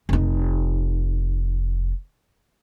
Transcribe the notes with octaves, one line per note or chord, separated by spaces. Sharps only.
F1 D#4